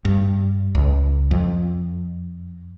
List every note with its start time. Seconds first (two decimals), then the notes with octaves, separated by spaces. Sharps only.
0.05 G2
0.75 C#2
1.31 F2